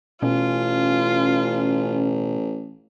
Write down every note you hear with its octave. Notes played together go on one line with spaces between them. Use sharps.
A1 B2 C#4 F4